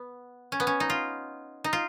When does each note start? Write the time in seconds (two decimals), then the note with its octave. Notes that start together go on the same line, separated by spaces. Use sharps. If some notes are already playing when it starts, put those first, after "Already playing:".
Already playing: B3
0.52 C#4
0.60 B3
0.67 C#4
0.80 D#4
0.90 F4
1.64 D#4
1.73 F4